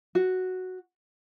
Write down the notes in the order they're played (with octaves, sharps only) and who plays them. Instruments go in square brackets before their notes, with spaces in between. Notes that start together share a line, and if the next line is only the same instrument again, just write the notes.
[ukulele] F#4